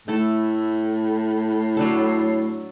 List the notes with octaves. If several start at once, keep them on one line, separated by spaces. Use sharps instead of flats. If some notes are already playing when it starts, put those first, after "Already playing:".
A2 A3 E4 A4
F#3 D4 A4